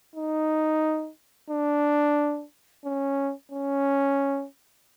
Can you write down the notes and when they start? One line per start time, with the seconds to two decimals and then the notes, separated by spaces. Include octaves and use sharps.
0.16 D#4
1.50 D4
2.85 C#4
3.52 C#4